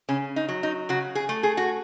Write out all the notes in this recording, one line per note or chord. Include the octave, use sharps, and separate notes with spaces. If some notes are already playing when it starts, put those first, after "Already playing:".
C#3 C#4
D#4
F#3
D#4
C#3 F#4
G#4
A3
G#4
F#4